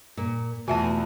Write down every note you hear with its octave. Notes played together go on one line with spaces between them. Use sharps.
A#2
E2 B2 A3 F4 F#4 E5 G#5 A5